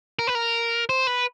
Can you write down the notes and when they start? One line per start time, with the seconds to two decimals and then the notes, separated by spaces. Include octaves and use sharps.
0.19 A#4
0.27 B4
0.35 A#4
0.89 C5
1.07 B4